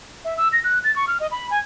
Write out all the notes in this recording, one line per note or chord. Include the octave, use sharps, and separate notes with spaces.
E5
E6
A#6
F#6
A6
C#6
F6
D#5
B5
G#5